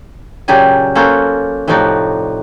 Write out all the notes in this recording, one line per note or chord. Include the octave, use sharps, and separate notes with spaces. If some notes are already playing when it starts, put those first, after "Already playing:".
A#2 C#3 F#3 G4 D5 G#5
A#3 C#4 F#4 A4 C5
A2 C3 F3 D#4 F#4 D5